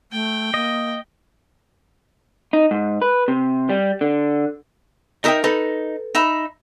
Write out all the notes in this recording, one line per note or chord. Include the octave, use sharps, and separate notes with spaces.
A3 G5
A#3 D#5
D#4
G#2
B4
C3
G3
D3
D#4 A#4 D#5 E5 G5 D#6
D#4 A4 B4
D#4 E5 B5